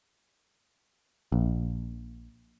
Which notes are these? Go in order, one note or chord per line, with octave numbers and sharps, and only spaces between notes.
A#1